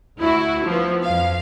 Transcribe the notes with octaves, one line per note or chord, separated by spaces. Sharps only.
D2 E4 F#4
F3 B3
F2 F5